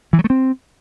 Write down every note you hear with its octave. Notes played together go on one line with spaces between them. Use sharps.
E3
F#3
A3
C4